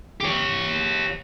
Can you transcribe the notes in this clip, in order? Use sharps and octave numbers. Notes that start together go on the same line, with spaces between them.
G4 C#5